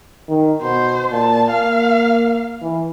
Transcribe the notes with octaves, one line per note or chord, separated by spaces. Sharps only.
D#3
B2 C5
A#2 A5
A#3 F5
E3